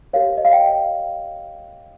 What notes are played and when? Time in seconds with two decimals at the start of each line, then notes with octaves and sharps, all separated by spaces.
0.13 G4 A#4 C#5 F5
0.37 D#5
0.45 F5
0.53 G5